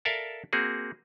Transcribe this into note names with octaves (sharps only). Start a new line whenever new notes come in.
A4 A#4 D5 E5 F5 A5
A#3 C4 F#4 G#4